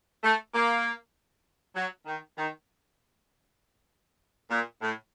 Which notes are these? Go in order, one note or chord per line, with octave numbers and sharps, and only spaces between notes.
A3
A#3
F#3
D#3
D#3
A#2
A2